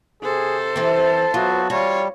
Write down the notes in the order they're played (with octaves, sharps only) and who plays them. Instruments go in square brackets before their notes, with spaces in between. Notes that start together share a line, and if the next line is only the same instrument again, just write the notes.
[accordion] C3 [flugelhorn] G#4 [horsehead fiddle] A4 C5
[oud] E3 C4 [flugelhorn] A5
[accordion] F#3 B3 F#4 [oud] F4
[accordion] G3 [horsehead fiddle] F4 C#5 [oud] F#4